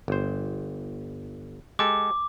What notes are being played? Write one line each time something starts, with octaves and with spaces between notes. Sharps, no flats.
G1 C5
G#3 G4 A4 D6